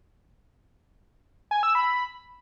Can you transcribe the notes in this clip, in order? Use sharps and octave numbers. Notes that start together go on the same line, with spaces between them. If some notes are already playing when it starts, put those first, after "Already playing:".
G#5
E6
B5